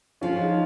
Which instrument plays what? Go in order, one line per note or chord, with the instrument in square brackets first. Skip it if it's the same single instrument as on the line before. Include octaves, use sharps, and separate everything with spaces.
[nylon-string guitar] F3 [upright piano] C#4 F4
[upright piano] D#4 G#4